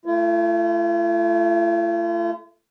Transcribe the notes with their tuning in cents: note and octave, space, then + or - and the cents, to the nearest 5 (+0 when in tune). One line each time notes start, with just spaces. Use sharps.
A3 +0 F4 -45